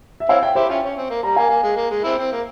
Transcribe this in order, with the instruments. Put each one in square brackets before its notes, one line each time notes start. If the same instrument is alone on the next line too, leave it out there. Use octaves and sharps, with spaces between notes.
[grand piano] E5
[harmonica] C4 E4 [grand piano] C#5 F5
[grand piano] E5 G5
[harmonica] E4 G4 [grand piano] C5 E5
[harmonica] C#4 F4 [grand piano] E5 G5
[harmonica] C#4
C4
A#3
[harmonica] G3 [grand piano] A#5
[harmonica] A#3 [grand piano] F5 G#5
[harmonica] A#3
G#3
A#3
G#3
C4 E4
C4
A#3